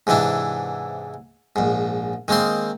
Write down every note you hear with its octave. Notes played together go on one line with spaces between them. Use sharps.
G#2 C3 E3 D4 E4
A#1 G#2
D#3 G#3 A#3 C4 C6